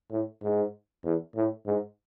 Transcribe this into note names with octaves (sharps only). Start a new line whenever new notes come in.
A2
G#2
E2
A2
G#2